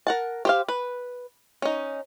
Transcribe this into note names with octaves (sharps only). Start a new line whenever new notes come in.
A#4 F#5 A5
G4 C5 F5
B4
C#4 D#4